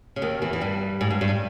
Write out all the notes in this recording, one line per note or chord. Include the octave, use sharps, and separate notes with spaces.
C#3
D#2 D#3
E2 E3
E3
G2 G3
G#2
G2
G2